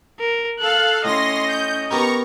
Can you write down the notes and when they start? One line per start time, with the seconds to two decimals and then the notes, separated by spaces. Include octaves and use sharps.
0.20 A#4
0.60 A4 F5 F#6
1.05 A2 C#4 D#5 C6 A#6
1.47 G6
1.91 B3 G4 A#4 A#5 C#6